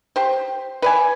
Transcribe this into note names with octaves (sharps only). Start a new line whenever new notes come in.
G4 C5
B4 D5 G#5